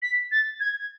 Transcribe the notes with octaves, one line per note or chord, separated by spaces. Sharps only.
B6
A6
G#6